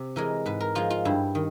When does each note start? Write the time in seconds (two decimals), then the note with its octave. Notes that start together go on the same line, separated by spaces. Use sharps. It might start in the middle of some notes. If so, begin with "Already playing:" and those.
Already playing: C3
0.16 E3 G#3 A#4
0.46 G#2 B4
0.61 A#4
0.75 F3 G#3 F4
0.90 F4
1.05 G2 E4
1.35 D#3